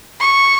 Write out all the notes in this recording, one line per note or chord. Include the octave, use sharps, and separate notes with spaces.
C#6